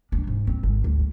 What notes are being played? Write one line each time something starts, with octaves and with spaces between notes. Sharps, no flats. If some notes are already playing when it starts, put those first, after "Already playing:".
D4
G#2
C4
G#1
D2
D3